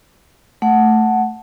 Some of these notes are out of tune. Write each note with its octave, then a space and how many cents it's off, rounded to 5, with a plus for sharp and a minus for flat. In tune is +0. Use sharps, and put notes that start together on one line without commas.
A3 +0 F#5 +0